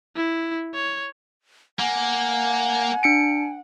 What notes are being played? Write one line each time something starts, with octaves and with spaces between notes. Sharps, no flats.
E4
C#5
A#3 F#5 G#5
D4 C#7 D7